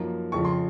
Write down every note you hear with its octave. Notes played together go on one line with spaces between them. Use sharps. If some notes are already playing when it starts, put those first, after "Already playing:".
Already playing: F#2 F3 A#3 D#4
F2 C#3 F3 C#6
C6